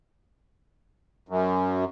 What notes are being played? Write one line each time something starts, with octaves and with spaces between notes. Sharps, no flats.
F#2